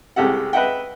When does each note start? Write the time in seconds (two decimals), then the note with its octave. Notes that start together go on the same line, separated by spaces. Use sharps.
0.16 C2 G#3 G4 A4 F#5
0.53 B4 D#5 E5 F#5 G5